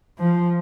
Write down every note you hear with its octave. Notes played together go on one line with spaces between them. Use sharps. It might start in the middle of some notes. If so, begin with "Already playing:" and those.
F3